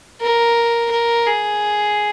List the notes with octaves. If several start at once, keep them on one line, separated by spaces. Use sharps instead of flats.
A#4
A#4
G#4